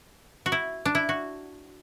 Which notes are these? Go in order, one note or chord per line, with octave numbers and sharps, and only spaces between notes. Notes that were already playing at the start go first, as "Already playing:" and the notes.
F#4
E4
D4
E4
F#4